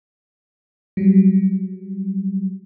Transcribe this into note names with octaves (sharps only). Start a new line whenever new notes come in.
F#3 G3